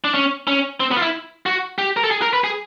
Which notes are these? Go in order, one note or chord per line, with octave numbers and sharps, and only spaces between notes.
D4
C#4
C#4
C4
B3
F4
E4
F#4
G4
A#4
A4
G#4
A#4
B4
G#4